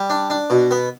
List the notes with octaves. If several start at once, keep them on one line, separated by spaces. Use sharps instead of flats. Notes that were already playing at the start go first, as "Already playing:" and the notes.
Already playing: G3
D4
D4
B2
B3